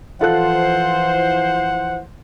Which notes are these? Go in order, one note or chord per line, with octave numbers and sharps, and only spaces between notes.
E3 F3 F4 A4 C5 F#5 F#6